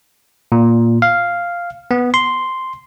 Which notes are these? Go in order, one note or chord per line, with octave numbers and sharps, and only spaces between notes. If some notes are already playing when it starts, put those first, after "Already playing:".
A#2
F5
B3
C6